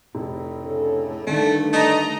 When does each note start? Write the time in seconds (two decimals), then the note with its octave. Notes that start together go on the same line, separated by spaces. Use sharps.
0.15 F1 A2
0.62 C#3 D4 A4
1.27 G2 D3 D#3 A3 D4
1.73 A3 D#5 A#5